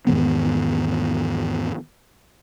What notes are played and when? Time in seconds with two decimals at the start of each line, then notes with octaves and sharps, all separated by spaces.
0.07 E2 G#2 D#3 B3